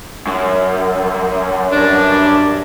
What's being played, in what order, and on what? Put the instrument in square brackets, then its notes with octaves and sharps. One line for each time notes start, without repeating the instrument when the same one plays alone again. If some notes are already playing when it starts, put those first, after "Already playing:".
[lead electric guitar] F#2
[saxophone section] G2 D4